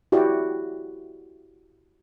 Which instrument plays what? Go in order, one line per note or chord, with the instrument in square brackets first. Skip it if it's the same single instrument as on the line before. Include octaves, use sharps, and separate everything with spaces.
[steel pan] E4 F#4 G4 D5